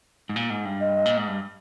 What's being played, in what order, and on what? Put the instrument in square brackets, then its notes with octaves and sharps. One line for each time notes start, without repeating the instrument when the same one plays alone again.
[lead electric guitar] G#2
A#2
G#2
G2
[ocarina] D#5
[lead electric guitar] A#2
G#2
G2